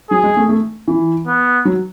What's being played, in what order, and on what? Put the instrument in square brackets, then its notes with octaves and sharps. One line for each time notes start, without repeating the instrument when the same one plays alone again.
[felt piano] F#3 [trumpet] G#4
[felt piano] G#3
A3
A3
E3
[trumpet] B3
[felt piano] F#3